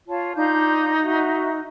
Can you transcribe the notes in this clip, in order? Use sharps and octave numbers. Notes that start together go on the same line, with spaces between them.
F4 C#5 A5
D4 D#4 F4 G6
F#4 D#5 E5